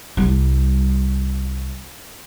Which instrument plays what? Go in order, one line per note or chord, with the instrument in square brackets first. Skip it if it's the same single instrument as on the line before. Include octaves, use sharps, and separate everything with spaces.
[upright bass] C2 G3